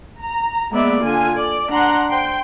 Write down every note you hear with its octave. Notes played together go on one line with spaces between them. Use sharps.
A#5
G#3 A#3 B3 D5 E5
D3 F4 G#5
D5
D4 F#5 A#5 C6
C5 G5 C6